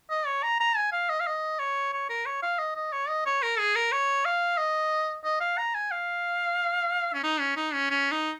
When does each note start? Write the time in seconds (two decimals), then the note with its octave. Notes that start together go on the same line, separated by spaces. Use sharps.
0.10 D#5
0.27 C#5
0.43 A#5
0.60 A#5
0.77 G#5
0.93 F5
1.10 D#5
1.20 F5
1.27 D#5
1.59 C#5
1.93 C#5
2.10 A#4
2.26 C#5
2.43 F5
2.59 D#5
2.76 D#5
2.92 C#5
3.08 D#5
3.26 C#5
3.42 A#4
3.58 G#4
3.76 A#4
3.92 C#5
4.25 F5
4.58 D#5
5.25 D#5
5.41 F5
5.58 A#5
5.74 G#5
5.91 F5
7.13 C#4
7.23 D#4
7.40 C#4
7.56 D#4
7.73 C#4
7.90 C#4
8.12 D#4